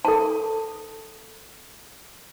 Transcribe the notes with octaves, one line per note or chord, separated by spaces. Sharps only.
A4 A5